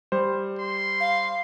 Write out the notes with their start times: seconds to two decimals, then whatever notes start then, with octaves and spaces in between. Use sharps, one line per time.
0.12 G3 C5
0.58 C6
1.00 F5